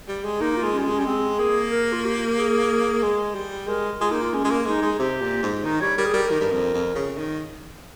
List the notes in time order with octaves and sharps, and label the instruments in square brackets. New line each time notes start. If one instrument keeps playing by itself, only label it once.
[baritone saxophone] G3
G#3
[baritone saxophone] A#3 [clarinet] D#4
[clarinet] F4
[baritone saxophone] G#3
[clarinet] C#4
[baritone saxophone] G3
G#3
[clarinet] C#4
[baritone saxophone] G3
[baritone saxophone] G#3 [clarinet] C4
[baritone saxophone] A#3 [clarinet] G#4
[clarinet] A#4
F4
G4
G#4
[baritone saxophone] G#3
G3
[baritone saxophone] G#3 [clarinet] A#4
[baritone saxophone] G#3 [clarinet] F4
[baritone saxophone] A#3 [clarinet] D#4
[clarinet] F4
[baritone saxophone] G#3 [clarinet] C#4
[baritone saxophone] G#3
A#3
[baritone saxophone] G#3 [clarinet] D#4
[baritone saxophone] G#3
[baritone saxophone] C3 [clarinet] G4
[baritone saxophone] A#2
G#2
[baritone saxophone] D#3 [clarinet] D#4
[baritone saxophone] G3 [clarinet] C#5
[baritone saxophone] G3 [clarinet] A#4
[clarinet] G#4
[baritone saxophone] G3 [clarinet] A#4
[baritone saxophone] D#3
G2
F2
F2
C#3
D#3